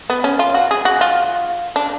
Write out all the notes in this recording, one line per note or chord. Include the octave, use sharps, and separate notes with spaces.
B3
C#4
F4
F#4
G#4
F#4
F4
D4